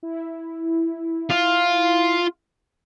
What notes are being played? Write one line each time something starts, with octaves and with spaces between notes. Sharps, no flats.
E4
F4